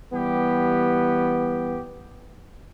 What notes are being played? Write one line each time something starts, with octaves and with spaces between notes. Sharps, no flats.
E3 G3 B3 G4